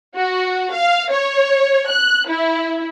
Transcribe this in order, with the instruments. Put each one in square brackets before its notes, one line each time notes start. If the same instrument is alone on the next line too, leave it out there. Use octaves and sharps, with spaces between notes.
[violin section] F#4
F5
C#5
F#6
E4